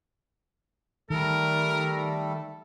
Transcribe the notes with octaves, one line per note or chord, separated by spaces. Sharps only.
D#3 G3 A3 A4 A#4